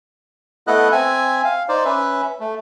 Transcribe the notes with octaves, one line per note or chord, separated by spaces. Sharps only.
A3 B3 E4 A4 D#5 F#6
C4 E5 G#5
F5
D#4 C5 D5
C#4 B4 E5
A3